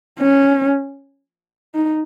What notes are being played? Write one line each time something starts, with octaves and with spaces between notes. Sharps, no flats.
C#4
D#4